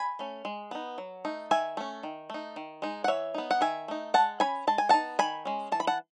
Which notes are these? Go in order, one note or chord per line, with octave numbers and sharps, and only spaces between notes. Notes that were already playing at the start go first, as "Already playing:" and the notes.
Already playing: G#5 B5
A3 C#4
G#3
B3 D#4
F#3
A3 D#4
D#3 E5 G#5
A3 C#4
D#3
A3 D#4
D#3
G#3 D#4
F#5
E3 C#5 E5
B3 D#4
F#5
D#3 E5 G#5
A3 D#4
G#3 F#5 A5
C#4 G#5 B5
G#3 A5
G#5
B3 D#4 F#5 A5
D#3 G#5 B5
G#3 C#4
E3 A5
B5
F#5 A5